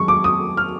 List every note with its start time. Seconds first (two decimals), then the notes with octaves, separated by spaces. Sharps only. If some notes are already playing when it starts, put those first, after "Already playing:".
Already playing: F#2 D#3 G#3 C#6
0.08 D6
0.24 D#6
0.57 F6